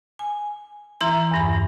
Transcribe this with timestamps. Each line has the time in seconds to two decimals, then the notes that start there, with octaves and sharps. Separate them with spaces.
0.19 G#5
1.01 E3 E4 E5 A#5 C6
1.31 E2 G2 B5